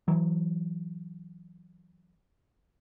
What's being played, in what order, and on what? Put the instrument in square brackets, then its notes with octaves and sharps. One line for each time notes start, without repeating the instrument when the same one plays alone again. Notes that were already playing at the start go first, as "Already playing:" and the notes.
[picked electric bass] E3 F#3